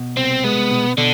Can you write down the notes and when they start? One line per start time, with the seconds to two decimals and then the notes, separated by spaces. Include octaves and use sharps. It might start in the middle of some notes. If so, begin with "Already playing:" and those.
Already playing: B2
0.17 C2 C4
0.44 G#3 B3
0.71 B2
0.97 B2 D3